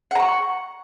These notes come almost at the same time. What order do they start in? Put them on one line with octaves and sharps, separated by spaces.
F#5 A#5 C#6